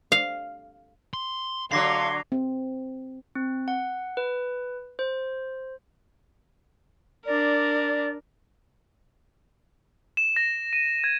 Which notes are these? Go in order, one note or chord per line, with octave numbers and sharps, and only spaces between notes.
F5
C6
D3 F#3 F5 C6 D6 A#6 C7
C4
C4
F#5
B4
C5
D4 A#4 D5
E7
A#6
D#7
G#6